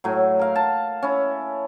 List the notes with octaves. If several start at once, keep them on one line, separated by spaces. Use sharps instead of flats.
A2 F#3
A#4 F5
A5
C#4 E4